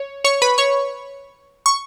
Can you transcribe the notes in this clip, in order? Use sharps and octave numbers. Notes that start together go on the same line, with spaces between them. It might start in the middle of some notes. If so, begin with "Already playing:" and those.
Already playing: C#5
C#5 C#6
B4 B5
C#5 C#6
C#6